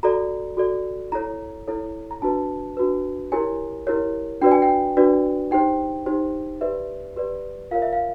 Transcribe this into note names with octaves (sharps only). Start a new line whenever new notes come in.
F#4 A4 D5 A#5
F#4 A4 D5
E4 A4 C#5 A#5
E4 A4 C#5
A#5
D4 F#4 B4 A5
D4 F#4 B4
E4 G4 A#4 C#5 G#5
E4 G4 A#4 C#5
D4 F#4 B4 D5 G5
G#5
G5
D4 F#4 B4 D5
D#4 G4 C5 G5
D#4 G4 C5
G4 B4 D5 E5
G4 B4 D5
F4 A#4 C#5 F5
E5
F5